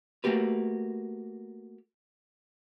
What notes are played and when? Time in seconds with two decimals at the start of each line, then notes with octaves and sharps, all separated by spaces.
0.24 A3 A#3 F#4 G4 B4